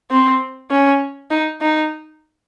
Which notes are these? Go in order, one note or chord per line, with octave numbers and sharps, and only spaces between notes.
C4
C#4
D#4
D#4